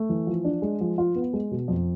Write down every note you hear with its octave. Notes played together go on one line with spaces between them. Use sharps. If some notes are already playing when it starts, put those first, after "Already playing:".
Already playing: A3
E3
F3
D4
G#3
F3
F4
B3
G#3
B2
F2